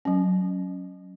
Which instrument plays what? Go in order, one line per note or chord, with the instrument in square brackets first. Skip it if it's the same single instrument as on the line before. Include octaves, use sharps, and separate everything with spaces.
[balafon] F#3 C#4